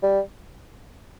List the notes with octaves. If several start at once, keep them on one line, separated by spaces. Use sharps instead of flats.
G3